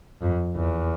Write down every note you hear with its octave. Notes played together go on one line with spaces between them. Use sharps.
F2
E2